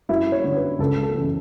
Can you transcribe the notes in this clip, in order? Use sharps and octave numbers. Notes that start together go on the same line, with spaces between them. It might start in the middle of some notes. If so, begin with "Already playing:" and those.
F#2 E4
C#5
D3
B4
C#2 A4
A4
C#3 E3